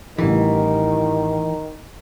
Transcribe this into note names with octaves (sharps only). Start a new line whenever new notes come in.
A1 D#3 E3 G3